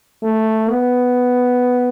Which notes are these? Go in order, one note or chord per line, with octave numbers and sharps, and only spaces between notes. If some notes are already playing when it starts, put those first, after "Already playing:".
A3
B3